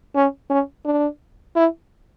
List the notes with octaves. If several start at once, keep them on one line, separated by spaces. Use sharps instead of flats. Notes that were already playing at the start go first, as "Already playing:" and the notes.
C#4
C#4
D4
E4